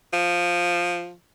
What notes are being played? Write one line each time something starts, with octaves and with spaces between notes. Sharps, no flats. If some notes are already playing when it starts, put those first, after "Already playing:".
F3